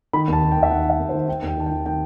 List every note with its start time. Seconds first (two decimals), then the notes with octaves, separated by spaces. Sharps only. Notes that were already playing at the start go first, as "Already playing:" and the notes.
0.13 D#3 B5
0.28 D#2 A5
0.42 D#2
0.52 G5
0.57 D#2
0.63 E5
0.71 D#3 F#5
0.85 D#3 E5
1.00 D#2
1.09 C5
1.14 D#3
1.28 D#3 G5
1.42 D#2
1.47 G5
1.57 D#3 A5
1.66 G5
1.71 D#3
1.85 D#3 G5